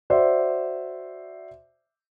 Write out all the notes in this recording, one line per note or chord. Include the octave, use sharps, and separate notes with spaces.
F#4 C5 D5 E5